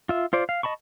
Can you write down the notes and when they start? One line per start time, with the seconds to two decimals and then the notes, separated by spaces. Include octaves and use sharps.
0.09 F4 E5
0.33 F4 C5 D5
0.49 F5
0.63 D#5 A5 B5 C#6